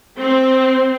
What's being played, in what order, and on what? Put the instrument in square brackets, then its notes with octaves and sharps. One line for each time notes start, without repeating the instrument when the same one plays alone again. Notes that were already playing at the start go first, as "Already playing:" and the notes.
[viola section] C4